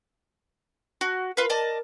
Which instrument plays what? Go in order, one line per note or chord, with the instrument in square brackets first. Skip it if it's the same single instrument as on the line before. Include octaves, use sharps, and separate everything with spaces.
[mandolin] F#4
[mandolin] F4 B4 [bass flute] A#4
[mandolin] D5 D#5 A5